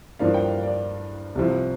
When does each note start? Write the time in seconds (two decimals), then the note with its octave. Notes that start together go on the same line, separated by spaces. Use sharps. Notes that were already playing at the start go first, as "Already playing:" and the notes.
0.19 G2 F3 A#3 D4 F5
0.34 G5
0.48 F5
0.63 D5
1.35 C2 C3 F3